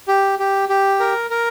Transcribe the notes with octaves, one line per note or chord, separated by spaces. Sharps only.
G4
G4
G4
A#4
A#4